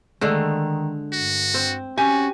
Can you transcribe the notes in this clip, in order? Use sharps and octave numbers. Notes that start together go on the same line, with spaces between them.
D3 D#3 G#3 A3
G2 F#4
C4
C#4 F#4 G4 G#5